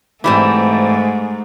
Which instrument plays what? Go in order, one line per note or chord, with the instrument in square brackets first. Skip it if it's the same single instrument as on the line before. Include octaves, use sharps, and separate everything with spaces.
[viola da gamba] G#2 A3 [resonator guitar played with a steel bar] E3 G3 C4